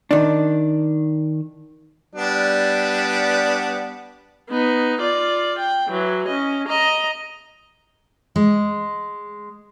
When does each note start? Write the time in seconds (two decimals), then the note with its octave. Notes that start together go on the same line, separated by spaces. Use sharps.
0.11 D#3 D4
2.15 G3 B3 D4
4.50 B3 D#4
5.01 F4 D5
5.58 G5
5.89 E3 F#3
6.28 C#4 D#5
6.68 D#5 A#5
8.36 G#3